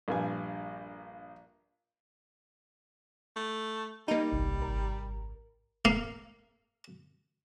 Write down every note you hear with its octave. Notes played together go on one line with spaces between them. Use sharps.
A#1 G2 G#5
A3
G3 A#3 D#4
G1 C2
G#1 A#4
A#3 F5